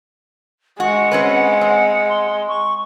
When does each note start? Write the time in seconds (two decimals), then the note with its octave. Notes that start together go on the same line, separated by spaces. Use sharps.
0.80 G#3 F#4 F#5
1.11 C4 C#4 B4
1.61 C4 F#5
2.09 C6
2.48 C#6